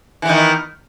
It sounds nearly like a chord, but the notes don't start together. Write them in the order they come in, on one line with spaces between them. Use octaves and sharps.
E3 B3 D#3